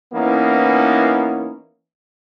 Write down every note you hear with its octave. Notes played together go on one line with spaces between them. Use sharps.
E3 A#3 B3 C#4 D#4 E4